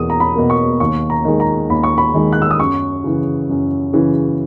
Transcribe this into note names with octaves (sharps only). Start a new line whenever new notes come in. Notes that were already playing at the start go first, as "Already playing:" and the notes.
Already playing: E2 B2 A#3 D#6
A#5
B5
B2 A#3
C#6
D#2 C#6
A#5
D#3 G#3
A#5
D#2 B5
C#6
B5
D#3 G#3
F#6
E6
D#6
F#2 C#6
C#3 E3
F#2
C#3 E3